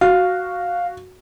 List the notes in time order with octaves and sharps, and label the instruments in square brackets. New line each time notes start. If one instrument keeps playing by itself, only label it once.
[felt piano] F#4 [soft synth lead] F5